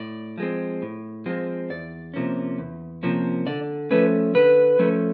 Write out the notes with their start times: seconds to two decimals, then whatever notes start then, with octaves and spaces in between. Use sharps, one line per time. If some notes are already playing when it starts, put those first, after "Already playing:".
Already playing: A2 D5
0.38 F3 G#3 C4
0.82 A2
1.26 F3 G#3 C4
1.70 E2 D5
2.14 C3 F3 A#3 C#4
2.58 E2
3.03 C3 F3 A#3 C#4
3.47 D3 D5
3.91 F3 A3 C#4 B4
4.35 D3 B4
4.79 F3 A3 C#4